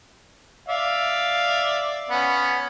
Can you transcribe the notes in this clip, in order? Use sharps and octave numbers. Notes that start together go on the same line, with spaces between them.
D5 E5 F5
B3 C#4